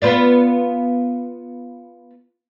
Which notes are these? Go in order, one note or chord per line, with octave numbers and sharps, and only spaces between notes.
B3 F4 D5